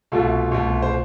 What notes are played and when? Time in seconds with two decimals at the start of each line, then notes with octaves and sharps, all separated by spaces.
0.12 C2 B2 A3 F4 A4
0.51 C2 B2 A3
0.82 C5